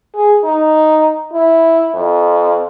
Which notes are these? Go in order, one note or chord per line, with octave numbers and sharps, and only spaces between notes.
G#4
D#4
E4
F2